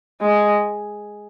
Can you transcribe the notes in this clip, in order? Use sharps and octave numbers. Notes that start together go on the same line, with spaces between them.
G#3